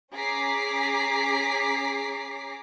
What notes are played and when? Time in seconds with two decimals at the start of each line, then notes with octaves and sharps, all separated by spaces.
0.14 C#4 G#4 A#5 D6 B6 C7